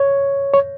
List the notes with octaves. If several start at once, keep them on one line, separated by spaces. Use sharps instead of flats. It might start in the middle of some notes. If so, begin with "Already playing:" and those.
Already playing: C#5
C#5